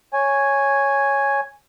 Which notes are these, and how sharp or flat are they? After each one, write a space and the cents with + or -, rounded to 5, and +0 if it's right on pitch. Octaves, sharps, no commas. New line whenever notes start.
C#5 +0 G#5 +0